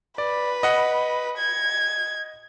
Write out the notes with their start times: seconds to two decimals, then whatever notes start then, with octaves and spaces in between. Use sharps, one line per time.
0.18 B4 D5
0.63 D#5 F#5 B5
1.38 G#6